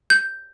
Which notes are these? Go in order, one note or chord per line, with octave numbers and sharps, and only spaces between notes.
G6